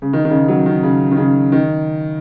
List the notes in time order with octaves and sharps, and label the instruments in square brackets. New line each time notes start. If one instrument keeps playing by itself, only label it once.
[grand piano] C#3
D#3
D#3
C#3
F#3
D#3
C#3
D#3
C#3
D#3